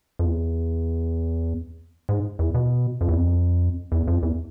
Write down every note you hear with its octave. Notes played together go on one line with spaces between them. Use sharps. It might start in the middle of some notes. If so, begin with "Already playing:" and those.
F2
E2
G#2
E2
B2
F2
E2
F2
E2
F2
E2